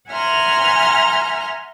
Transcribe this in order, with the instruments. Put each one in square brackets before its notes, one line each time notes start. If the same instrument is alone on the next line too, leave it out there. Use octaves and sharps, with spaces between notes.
[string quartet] E5 F#5 G#5 A#5 C6 F6